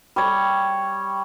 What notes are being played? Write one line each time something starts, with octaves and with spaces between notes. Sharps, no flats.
G3 C#5